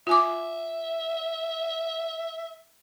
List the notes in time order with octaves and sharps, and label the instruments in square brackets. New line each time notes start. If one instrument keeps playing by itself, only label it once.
[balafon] F4 G#5 D6 [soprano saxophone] E5